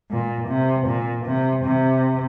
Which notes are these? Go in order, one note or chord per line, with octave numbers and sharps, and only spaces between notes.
A#2
C3
A#2
C3
C3